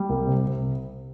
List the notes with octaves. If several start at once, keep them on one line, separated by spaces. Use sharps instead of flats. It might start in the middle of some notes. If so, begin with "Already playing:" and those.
Already playing: G3
C2
C3
C3